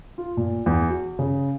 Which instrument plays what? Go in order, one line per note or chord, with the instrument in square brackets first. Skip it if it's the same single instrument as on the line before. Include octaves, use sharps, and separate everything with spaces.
[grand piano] F4
A#2
E2
F#4
C#3